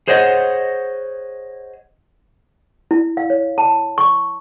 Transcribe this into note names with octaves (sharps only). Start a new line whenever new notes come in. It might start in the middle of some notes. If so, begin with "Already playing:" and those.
G#4 C5 C#5 D#5 F#5
E4
F5
C#5
A5
C#6